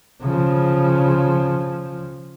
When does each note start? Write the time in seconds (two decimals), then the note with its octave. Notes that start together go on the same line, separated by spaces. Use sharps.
0.22 C#3 F3